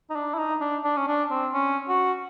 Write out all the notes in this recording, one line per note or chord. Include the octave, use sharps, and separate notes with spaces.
D#4
D4
E4
D#4
D4
D4
C#4
D4
C4
C#4
F#4